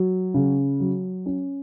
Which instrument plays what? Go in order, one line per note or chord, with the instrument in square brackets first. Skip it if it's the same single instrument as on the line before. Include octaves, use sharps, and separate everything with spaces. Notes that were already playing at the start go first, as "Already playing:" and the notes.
Already playing: [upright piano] F#3
C#3
F#3
C#4